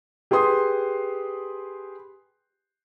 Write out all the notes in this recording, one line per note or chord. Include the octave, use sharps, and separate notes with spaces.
G4 G#4 B4 C6 D#6